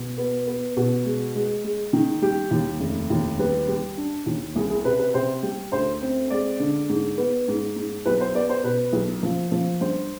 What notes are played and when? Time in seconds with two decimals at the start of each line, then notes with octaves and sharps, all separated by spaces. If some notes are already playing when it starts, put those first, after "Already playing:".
Already playing: B2
0.18 B3
0.47 B3
0.77 B2
1.05 G#3
1.35 G#3
1.64 G#3
1.93 D#3
2.22 G3 G4
2.51 D#2
2.80 F1
3.10 D#2
3.39 G3 B4
3.68 G3
3.97 D4
4.26 D#2
4.56 C2 G#4
4.70 G#4
4.85 C3 B4
4.99 B4
5.14 C3 C5
5.43 G3
5.72 D2 C5
6.02 C4
6.30 G#3 D5
6.60 D3
6.89 G#2
7.18 B3
7.48 G#2
7.76 G#2
8.06 B1 B4
8.21 C5
8.35 B3 D5
8.49 C5
8.64 B2 B4
8.93 B1
9.23 F3
9.52 F3
9.81 G2 C5